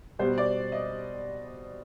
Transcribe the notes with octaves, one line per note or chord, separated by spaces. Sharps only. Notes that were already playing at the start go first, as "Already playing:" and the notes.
B2 G3 B3 C5
D5
D#5